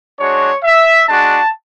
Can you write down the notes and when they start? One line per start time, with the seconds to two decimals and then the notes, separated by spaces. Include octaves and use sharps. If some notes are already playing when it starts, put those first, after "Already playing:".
0.19 G#3 D4 F#4 C#5
0.64 E5
1.09 G#3 D4 F#4 A5